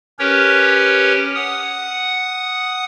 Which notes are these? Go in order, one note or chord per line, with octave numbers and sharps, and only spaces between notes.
C#4 G4 A#4 B4 C#5
F#5 D#6